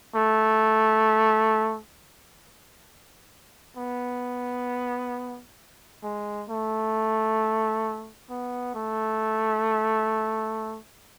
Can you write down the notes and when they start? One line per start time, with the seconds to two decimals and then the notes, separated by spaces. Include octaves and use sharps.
0.15 A3
3.77 B3
6.03 G#3
6.49 A3
8.30 B3
8.75 A3